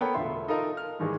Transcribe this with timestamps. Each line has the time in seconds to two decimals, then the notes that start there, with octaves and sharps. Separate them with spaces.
0.01 B3 A4 A#4 C#5 G5 B5
0.14 E1 D3 A3 F4 E5 C6
0.48 D#4 F4 A4 A#4 D#5
0.77 F6
0.99 G#2 D#3 E3 G3 G#3